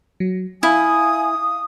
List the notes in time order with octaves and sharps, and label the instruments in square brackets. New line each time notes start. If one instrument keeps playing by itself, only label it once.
[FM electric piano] F#3
[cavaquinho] E4 [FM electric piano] F5 [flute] G#5 [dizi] D#6